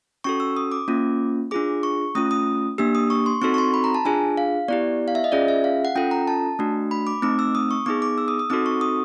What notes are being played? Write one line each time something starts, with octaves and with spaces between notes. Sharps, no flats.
C#4 F#4 A4 C#6
E6
D#6
D6
A#3 C#4 F4
D4 F4 G#4 D6
C#6
A3 C#4 F4 D#6
D#6
A#3 D4 G4 E6
D#6
C#6
C6
C4 D#4 F#4 A4 C#6
C#6
C6
B5
A#5
A5
D4 F4 G#4 G#5
F5
B3 E4 G4 D5
F5
E5
D#5
C#4 F4 G#4 D5
E5
F5
F#5
C#4 F4 A4 G5
A#5
A5
A3 D4 F#4
B5
D6
A3 C4 D#4 D6
E6
D#6
C#6
B3 D#4 G#4 D6
D6
E6
D#6
D#6
C4 D#4 F#4 A4 D6
C#6
D#6